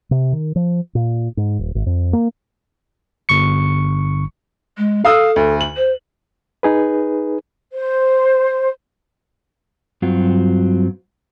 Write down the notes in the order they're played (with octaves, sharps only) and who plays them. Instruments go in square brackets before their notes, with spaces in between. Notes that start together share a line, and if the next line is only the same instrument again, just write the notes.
[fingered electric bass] C3
D#3
F3
A#2
G#2
D#1
G#1
F2
A#3
[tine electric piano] G1 C#6 C#7
[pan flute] G#3
[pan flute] A4 [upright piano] F5 D#6 E6
[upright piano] D2
F#7
[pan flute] C5
[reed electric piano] D#4 G#4 B4
[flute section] C5
[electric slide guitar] G2 F#3 C4 F4 F#4